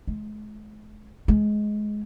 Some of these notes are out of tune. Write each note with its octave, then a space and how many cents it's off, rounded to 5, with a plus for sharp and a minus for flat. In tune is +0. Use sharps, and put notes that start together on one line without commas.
G#3 +40
G#3 +20